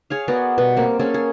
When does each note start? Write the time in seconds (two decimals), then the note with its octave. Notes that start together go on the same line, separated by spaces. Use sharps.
0.10 G#4 C#5 F5
0.28 B3 F#4 A#4 D5
0.58 B2 G3
0.77 A#3 C4
0.99 A#3 C#4 G#4 A4
1.14 G#4